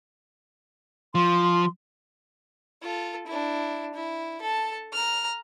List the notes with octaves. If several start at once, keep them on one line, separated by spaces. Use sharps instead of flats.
F3 C6
F4 A4
D4 E4
E4
A4 A5
A#5 F6